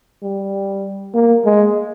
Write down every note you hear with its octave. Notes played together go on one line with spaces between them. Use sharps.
G3
A#3
G#3